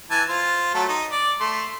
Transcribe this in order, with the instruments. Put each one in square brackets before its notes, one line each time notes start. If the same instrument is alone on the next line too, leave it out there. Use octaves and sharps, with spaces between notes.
[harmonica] E3 G#5 A5
F4 C5
F#3 A3 A4
D#4
D5
A3 C6